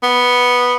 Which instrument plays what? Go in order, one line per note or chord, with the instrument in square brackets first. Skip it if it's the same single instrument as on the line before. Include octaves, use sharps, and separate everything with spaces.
[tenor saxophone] B3